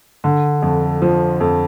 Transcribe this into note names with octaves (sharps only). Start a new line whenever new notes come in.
D3
F2
F3
F2